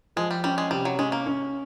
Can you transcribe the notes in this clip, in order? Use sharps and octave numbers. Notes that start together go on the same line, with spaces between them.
F3 G#3
G3
G3 C#4
G#3
C3 G3
F#3
G#3 C#4
A#3
C#4